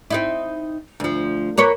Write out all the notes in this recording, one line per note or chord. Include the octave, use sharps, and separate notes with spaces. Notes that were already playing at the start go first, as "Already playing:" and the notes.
C4 D#4 E4
D2 F3
A#3 B4 C#5